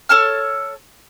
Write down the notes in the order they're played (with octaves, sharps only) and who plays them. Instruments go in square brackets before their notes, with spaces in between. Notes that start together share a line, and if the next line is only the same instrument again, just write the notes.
[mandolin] A4 C#5 A5 F6